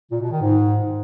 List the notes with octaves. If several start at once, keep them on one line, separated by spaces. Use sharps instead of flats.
A#2
B2
D#3
G#2